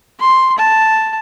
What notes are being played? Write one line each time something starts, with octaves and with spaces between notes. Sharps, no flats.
C6
A5